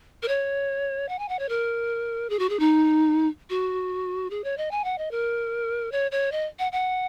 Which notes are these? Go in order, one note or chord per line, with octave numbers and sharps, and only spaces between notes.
A#4
C#5
F#5
G#5
F#5
C#5
A#4
G#4
F#4
G#4
D#4
F#4
G#4
C#5
D#5
G#5
F#5
D#5
A#4
C#5
C#5
D#5
F#5
F#5